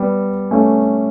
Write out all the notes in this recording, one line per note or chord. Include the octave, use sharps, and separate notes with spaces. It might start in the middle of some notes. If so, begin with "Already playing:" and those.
Already playing: G3 B3
A3 C#4